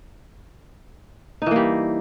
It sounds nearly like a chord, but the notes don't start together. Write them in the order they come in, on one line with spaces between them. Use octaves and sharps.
D#4 E3 A#3 G3